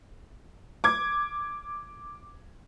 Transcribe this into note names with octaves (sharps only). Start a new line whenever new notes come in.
D6 G#6